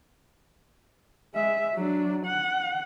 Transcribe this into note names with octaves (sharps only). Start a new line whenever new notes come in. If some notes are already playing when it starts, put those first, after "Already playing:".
G#3 E5
F#3 D4
F#5